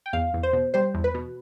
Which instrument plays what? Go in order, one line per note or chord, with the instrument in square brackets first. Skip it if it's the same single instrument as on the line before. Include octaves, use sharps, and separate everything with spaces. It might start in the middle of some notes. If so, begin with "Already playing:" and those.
[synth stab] G5
E2 F5
E2
C5
B2
G3 C5
E2
B4
B2